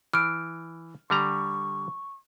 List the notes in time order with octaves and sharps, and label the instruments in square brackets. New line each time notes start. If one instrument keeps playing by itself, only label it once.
[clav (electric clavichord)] E3 [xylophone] F6 D7
[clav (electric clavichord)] D3 G3 A#5 [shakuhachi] C#6